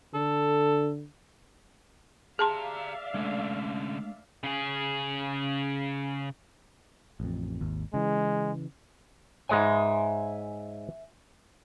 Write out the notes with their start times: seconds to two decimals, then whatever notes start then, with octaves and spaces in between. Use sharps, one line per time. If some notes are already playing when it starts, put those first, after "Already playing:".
0.14 D3 A4
2.39 G4 G#4 D5 E5 F5 A5 A#5 C6
3.14 D3 G#3 A3 C#4 D4
4.44 C#3 G#4
7.20 A1 F2
7.61 G#1 D#2
7.94 C#3 E3 G#3
9.49 G#2 G#3 C#5 E5 G#5